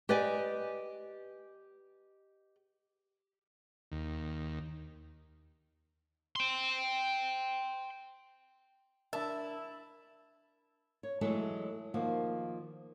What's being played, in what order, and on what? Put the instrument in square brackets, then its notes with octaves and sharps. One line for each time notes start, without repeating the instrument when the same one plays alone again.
[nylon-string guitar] G4 B4 D5 D#5 G#5
[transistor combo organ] D#2
[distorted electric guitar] G5 C6
[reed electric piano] D4 A#4 [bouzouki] E4 [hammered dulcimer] E5 A5
[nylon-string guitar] C#5
E3 F#3 G#3 A3 A4 E5
D#3 F3 A#3 F#4